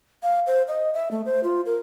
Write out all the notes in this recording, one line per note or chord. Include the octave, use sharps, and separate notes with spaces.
F5
C5
D#5
E5
A3
C5
F4
A#4